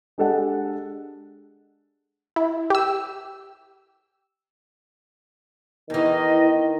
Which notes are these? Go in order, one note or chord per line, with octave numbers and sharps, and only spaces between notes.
G#3 D4 G4 A4 D#5 F#5
E4
G4 E6
E2 D#3 E3 D#5